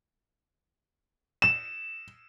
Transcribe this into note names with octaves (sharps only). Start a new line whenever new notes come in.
E7